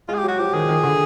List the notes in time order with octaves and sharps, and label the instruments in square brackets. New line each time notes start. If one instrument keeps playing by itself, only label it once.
[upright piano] G#3 [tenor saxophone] F4
[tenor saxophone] G#4
[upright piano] F#3 [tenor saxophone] G4
[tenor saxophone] F#4
[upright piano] F3 [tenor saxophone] G4
[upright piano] D#3 [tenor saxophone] G#4
[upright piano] D#3
D3